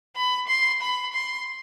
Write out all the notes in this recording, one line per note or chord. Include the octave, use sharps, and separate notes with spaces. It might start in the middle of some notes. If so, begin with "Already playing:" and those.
B5
C6
B5
C6